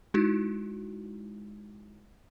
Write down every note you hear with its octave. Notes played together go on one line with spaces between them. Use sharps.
G#3 D#4 E4 F#4